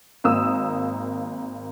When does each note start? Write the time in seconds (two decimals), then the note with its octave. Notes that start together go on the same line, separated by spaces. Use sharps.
0.24 G#1 A#3 D#6 E6